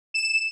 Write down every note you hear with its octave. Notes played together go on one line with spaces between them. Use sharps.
E7